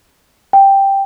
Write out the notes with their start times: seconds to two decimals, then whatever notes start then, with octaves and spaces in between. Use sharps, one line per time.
0.53 G5